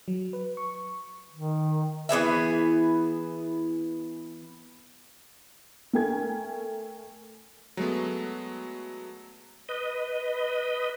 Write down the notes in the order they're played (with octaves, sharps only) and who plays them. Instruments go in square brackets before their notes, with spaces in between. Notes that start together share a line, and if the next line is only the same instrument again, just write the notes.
[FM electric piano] F#3
B4
C#6
[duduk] D#3
[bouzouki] E3 B3 G#4 E5
[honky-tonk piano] A3 A#4 G5 G#5 G#6
[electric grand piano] F#3 G#3 A3 B3
[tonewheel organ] B4 D#5